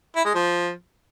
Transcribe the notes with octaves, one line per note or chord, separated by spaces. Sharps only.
E4
G#3
F3